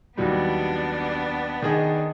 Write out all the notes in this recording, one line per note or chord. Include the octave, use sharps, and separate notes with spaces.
D#2 F#3 G3 B3 D4
D#3 G#4 D#5